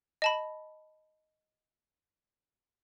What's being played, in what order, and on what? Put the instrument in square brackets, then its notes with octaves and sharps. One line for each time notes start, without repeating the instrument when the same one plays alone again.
[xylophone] D#5 A5 B5